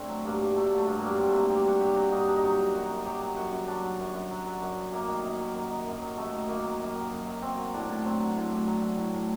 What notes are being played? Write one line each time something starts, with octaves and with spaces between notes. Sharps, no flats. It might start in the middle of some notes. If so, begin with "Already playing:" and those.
Already playing: A3 C4 D4
F#3
G2 A#3
G2
F#3 A3
F#3
A3
G2
G2 A#3
F#3 C4
A3
F#3 A#3
G2 G4
G2 F#4
F#3 G4
F#3 F#4
G2 D#4
G2 D4
D#4
F#3 F#4
F#3
F#2 F#4
F#2
F#3 G4
F#3
F#2 F#4
F#2
F#3 D4
F#3
F#2
F#2
F#3
F#3
F#2
F#2
F#2 A#3
D#3
F#2
F#3
F#2
D#3
F#2
F#3
F#2 A3
D#3
F#2 A#3
F#3
F#2
D#3
F#2
F#3
F#3 C4
F#3
A2 D4
A2
F#3 C4
F#3
A2
A2
F#3
F#3
A2
A2